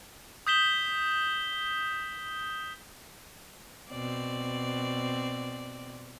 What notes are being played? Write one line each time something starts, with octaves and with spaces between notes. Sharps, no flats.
D#6 G6 B6 E7 G7
B2 C4 D5